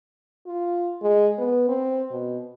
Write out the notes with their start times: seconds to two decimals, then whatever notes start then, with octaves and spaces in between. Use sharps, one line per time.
0.46 F4
1.02 G#3
1.38 B3
1.69 C4
2.11 B2